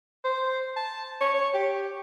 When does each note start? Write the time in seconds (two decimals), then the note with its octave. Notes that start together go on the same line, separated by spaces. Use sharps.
0.24 C5
0.76 A5
1.21 C#5
1.34 C#5
1.54 G4